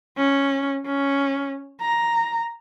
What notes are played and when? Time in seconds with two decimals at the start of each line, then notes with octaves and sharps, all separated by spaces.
0.17 C#4
0.86 C#4
1.81 A#5